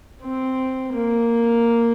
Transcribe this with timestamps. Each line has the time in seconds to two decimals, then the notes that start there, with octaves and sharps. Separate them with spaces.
0.23 C4
0.93 A#3